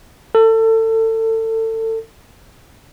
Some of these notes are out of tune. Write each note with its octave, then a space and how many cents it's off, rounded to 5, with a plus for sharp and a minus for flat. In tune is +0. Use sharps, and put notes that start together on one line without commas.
A4 +30